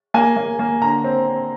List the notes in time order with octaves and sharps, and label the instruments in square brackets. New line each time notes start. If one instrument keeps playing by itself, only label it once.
[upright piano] A#3 G#5
A#3
A#3
D3 A#5
C4
C4